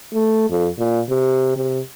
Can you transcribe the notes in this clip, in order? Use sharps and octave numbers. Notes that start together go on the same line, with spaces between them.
A3
F2
A#2
C3
C3